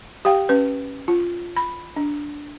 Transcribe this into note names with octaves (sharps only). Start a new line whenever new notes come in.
G4 F5 G5
C#4 B4
F4
B5
D4